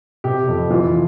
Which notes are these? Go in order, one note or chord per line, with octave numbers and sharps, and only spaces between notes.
C3 G4
F2
E3 F4